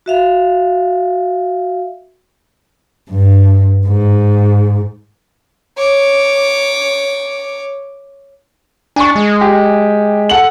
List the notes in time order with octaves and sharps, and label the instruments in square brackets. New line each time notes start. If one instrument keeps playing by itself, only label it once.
[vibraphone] F#4 E5 F5
[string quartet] G2
G#2
[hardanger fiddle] C#5 D6
[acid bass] D4 [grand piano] G#5 C#6
[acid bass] G#3
[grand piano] G4
A4 F#5 F#7